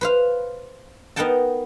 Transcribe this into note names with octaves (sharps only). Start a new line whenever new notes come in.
B4 C5 F5
B3 D#4 A#4 F#5 G5 A5